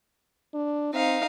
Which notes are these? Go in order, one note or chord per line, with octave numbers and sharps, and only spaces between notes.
D4
C4 D#4 F5